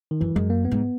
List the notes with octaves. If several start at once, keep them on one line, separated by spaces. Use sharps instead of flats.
D#3
F#2 E3
F#2 G#3
A#3
B3
G#2